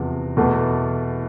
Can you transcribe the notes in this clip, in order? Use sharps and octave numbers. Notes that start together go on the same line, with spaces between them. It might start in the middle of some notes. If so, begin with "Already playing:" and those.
Already playing: E2 C3 F3
E2 B2 A3